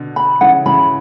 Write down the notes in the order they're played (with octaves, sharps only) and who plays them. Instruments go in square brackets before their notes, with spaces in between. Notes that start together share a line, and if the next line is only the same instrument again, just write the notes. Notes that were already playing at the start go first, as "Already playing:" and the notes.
Already playing: [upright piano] B2 D3
[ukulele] B5
[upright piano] C#3 E3 [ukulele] F#5
[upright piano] C#3 E3 [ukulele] B5